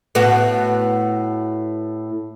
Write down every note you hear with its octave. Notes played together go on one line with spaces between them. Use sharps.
A2 B3 F#4